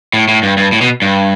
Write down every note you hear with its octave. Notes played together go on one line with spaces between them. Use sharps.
A2
A2
G2
G2
A2
B2
G2